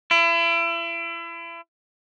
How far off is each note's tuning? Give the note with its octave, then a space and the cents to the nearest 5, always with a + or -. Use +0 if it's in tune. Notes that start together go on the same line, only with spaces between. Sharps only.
E4 +35